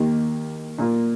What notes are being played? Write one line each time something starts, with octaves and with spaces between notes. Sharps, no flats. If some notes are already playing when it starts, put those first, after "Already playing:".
Already playing: D#2 D#3 A#3 G4
A#2 A#3 F4